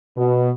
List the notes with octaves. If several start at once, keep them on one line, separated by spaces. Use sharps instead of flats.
B2